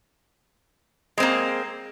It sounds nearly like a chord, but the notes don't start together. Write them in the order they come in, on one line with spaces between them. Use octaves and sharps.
G#3 C4 A#3